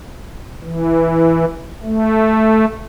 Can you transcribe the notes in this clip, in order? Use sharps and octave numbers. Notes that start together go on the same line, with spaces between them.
E3
A3